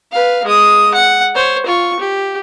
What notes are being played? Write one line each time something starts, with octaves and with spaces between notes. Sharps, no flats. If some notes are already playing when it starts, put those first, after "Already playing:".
B4 F5
G#3 D#6
F#5
C5 C#5
F4 C#6
G4